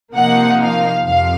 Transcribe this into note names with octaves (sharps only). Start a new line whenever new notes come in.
C3 F3 A#3 D#4 F#5
F5
F2 C3 F3 F5